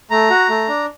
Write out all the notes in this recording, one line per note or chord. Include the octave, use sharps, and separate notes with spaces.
A3 A#5
F#4
A3
D4